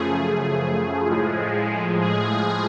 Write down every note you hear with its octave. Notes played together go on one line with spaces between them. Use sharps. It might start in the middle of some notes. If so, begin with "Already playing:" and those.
Already playing: F#2 C#3 F3 A3 G#4
A2 F3 G#3
G#4